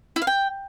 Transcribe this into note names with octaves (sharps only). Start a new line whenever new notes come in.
E4
F5
G5